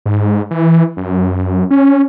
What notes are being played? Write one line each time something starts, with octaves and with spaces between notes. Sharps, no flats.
G#2
E3
F#2
C#4